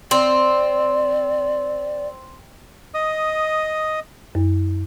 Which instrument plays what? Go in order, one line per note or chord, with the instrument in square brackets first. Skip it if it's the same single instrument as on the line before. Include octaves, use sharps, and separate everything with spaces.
[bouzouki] C4 [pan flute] D5
[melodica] D#5 D#6
[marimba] F#2